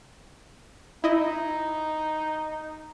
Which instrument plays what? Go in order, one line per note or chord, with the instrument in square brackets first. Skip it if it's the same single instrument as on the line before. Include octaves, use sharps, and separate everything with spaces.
[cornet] D#4 [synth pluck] E4 D#5